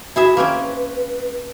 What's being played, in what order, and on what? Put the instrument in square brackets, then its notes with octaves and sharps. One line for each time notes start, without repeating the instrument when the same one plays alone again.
[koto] E4 G#4 E5 [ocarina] F#4
[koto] A#3 C4 C#4 [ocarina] B4